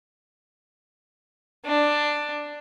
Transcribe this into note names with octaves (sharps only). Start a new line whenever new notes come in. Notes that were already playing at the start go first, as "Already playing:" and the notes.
D4